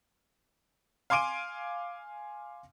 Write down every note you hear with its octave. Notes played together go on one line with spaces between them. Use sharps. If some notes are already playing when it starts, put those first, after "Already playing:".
F5 G#5 C6 D6 D7 D#7